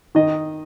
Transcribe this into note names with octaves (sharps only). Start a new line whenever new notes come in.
D#3 D#5